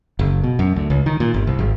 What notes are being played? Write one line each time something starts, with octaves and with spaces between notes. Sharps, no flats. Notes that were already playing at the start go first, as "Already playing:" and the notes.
F#1
B2
F#2
D2
C#2
D#3
A#2
G1
C2
G#1